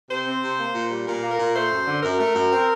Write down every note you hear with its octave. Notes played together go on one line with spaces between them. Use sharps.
C3 C5
C4
C3
A#3
A#2
G3
A#2 A#4
A#3
A#4
A#2
A3 C5
F#2
D3
F#2 A#4
A3
F#2
C4